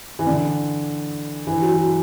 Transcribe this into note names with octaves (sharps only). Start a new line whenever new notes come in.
E3
D3
E3
F#3
F#3